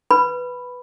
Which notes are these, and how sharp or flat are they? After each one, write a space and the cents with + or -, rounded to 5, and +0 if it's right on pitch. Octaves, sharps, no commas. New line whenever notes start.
B4 +0 B5 +0